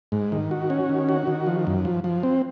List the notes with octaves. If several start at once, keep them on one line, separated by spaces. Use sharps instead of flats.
G#2
D#3
F#4
C#4
D#3
F#4
D#3
F3
F#2
F3
F3
C4